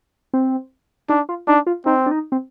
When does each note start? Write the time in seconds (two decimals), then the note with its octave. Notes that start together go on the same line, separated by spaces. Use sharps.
0.34 C4
1.09 D4 D#4
1.29 F4
1.48 D4 D#4
1.67 F4
1.86 C4 D#4
2.06 D4
2.11 D#4
2.32 C4